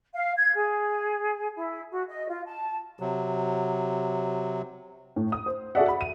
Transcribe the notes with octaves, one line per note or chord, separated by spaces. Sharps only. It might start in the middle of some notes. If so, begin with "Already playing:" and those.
F5
G#6
G#4
E4
F#4
D#5
F4
A5
C3 F#3
A2
D#6
C5
F#4 G#4 A4 D5 E5 F#5
B5
D#7